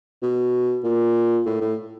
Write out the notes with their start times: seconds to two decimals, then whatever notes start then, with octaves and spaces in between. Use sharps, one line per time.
0.23 B2
0.84 A#2
1.46 A2
1.61 A2